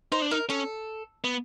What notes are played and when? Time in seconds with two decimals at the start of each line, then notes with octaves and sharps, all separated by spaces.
0.12 D#4 C5
0.22 D4
0.31 D#4 A#4
0.50 C#4 A4
1.24 B3